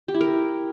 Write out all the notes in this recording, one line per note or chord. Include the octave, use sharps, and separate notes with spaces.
G4
E4
A#4